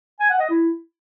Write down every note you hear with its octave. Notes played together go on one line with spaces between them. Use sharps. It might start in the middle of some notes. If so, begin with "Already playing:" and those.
G#5
F#5
D#5
E4